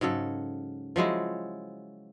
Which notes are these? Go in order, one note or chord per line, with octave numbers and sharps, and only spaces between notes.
G#2 C#3 F#3 A4
F3 F#3 G#3 E4